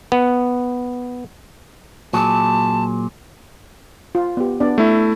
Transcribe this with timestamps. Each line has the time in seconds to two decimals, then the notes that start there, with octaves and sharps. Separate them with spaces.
0.12 B3
2.13 A#2 F#3 G#4 A5
4.15 F4
4.37 B3 G4
4.60 B3 D4 D5
4.78 A3 E4